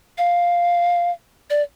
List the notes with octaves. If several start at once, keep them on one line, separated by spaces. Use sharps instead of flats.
F5
D5